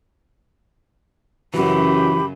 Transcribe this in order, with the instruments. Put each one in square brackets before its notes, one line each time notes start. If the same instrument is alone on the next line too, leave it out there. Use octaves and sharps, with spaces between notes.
[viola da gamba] F#2 C#3 [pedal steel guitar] E3 [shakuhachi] F#4 [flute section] G4 B5